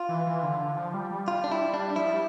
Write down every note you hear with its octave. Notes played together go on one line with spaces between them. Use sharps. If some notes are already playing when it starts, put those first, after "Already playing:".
Already playing: F4
E3
E3
D3
D3
F3
G3
G3
G3 F4
D4
E4
D4
F3 E4
G3